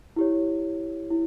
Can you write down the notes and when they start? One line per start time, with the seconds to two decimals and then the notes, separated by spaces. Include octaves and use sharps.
0.16 E4 G4 C#5
1.10 E4